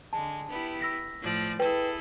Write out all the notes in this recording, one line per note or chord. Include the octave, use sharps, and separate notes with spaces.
D3 G#3 A5
B3 E4 G4
E6 A#6 B6
A2 F3 D5
E4 G#4 A4 B4 G5